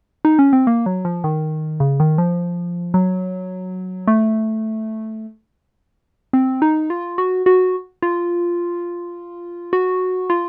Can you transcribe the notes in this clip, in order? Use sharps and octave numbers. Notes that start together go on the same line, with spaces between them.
D#4
C#4
C4
A#3
F#3
F3
D#3
C#3
D#3
F3
F#3
A3
C4
D#4
F4
F#4
F#4
F4
F#4
F4